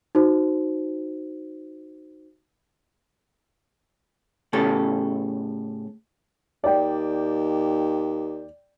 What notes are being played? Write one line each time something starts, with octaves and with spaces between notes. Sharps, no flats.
D#4 F#4 C5
A2 C#3 G4 A4
D#2 D5 G5